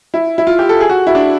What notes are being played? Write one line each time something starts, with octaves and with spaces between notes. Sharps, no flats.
E4
E4
F4
G4
A4
G#4
F#4
E4
D4